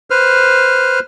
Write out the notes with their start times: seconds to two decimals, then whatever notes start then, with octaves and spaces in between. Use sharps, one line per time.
0.10 B4 C5 F6